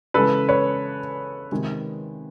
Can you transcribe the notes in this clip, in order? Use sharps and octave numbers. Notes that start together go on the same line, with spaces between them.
C#3 E3 G#3 A4 B4
B4 C#5
C3 D#3 G#3